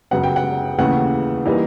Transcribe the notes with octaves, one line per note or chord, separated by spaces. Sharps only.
F#2 C#3 F#3 B3 F#5
G5
F#5
D#2 C#3 E3 A3 F#5
E3 G3 A#3 D#4